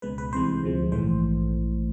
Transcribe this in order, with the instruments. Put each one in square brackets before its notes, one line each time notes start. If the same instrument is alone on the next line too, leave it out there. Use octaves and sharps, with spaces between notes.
[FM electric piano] C#2 B2 G#3 B4
B4
C2 C3 E3 G#3 C5
D2 C3 F3 G#3
A#1 G#2 E3 A3 C5